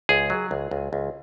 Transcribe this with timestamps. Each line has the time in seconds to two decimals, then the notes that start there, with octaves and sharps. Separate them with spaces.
0.09 C#2 G#4
0.30 F#3
0.51 C#2
0.71 C#2
0.93 C#2